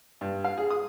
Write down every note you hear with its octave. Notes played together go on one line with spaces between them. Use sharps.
G2
F5
G#4
D#6